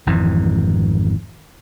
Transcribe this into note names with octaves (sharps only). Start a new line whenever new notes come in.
G#1 F2 G#2 E3